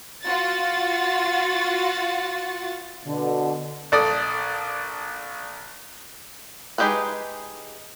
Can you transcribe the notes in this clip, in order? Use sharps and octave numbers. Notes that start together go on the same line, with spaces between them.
F4 F#4 A6
B2 D3
A#1 A4 D5 D#6
G#3 D#4 G4 G#4 B4